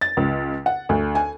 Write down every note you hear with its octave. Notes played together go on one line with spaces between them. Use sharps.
A6
C#2
F#5
D2
G#5